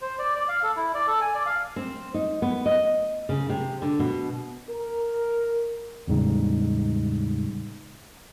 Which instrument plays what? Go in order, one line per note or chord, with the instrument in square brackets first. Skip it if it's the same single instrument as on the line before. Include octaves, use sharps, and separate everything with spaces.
[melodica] C5
D5
D5
F5
A4
E4
D5
A4
G#5
D5
F5
[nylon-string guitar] C4
D#4
B3
D#5
C#3
C3
D3
B2
[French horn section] A#4
[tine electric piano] E2 A2 C#3 G3 G#3 D#4